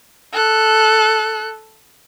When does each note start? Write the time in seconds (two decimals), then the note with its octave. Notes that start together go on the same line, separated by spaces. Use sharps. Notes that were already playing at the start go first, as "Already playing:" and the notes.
0.33 A4 F#6